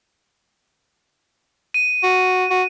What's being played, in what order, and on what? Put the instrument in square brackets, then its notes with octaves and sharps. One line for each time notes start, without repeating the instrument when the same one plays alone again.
[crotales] D#7
[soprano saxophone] F#4
F#4